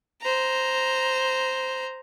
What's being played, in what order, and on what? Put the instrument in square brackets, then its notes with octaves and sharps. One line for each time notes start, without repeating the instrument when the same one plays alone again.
[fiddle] C5 A#5